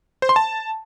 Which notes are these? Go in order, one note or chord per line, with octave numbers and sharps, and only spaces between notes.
C5
C6
A5